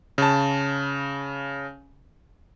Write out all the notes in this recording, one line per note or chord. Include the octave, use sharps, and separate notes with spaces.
C#3 A5